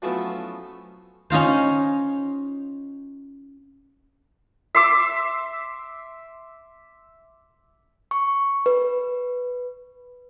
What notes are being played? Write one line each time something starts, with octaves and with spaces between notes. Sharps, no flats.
F3 F#3 A3 B3 C#4 E4
C#4 D#4 F4 C5
E5 C6 D6 E6
C#6
B4